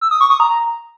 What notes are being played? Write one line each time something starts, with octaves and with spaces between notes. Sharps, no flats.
E6
D#6
C#6
D#6
A#5